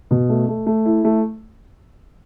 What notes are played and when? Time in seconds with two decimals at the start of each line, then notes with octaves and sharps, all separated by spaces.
0.11 B2
0.29 A3
0.48 A3
0.66 A3
0.85 E4
1.05 A3